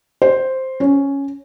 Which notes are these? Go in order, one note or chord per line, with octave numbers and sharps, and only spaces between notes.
C5
C#4